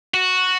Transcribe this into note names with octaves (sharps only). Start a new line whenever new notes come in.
F#4